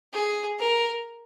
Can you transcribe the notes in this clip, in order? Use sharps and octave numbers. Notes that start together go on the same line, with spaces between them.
G#4
A#4